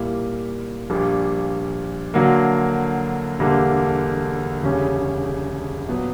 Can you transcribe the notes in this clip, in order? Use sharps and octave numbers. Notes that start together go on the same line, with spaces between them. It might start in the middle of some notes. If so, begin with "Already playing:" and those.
Already playing: A#2 G3 A#3 E4
A#1 A#2 G3
D2 D3 F#3 A#3
E1 D2 D3 G3 A#3
E1 D2 C#3 G3 C#4
A#2 F#3 B3